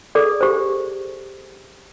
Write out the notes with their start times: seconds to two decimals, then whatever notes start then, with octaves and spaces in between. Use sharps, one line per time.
0.15 G#4 A4 D5
0.41 G4 C5